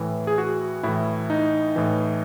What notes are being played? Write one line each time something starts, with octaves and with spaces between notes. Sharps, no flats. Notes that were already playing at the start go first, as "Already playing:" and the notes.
Already playing: A2 E3
G#4
F#4
A2 E3 E4
D#4
A2 E3